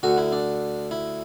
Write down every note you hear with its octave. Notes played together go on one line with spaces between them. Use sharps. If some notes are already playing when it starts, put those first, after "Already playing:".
D2 D3 F#4
E4
D4
E4